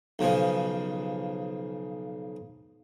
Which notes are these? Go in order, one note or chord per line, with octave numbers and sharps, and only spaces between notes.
B1 C#3 F3